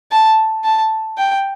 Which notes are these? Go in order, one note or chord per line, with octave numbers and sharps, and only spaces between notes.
A5
A5
G5